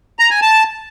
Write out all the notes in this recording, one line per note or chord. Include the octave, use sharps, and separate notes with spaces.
A#5
G#5
A5